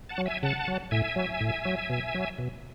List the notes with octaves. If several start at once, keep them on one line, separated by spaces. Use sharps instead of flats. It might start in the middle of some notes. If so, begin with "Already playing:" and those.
F#5 A5
F#3
E5 G#5
C#3 F#5 A5
F#3
A2 E5 G#5
F#3
A2
F#3
B2
F#3
B2